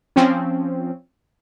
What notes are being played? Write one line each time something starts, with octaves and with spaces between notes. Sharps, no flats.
F3 C4 C#4